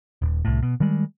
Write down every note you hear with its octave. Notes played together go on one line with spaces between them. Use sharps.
D#1
C2 A2
B2
D#3 G3 G#3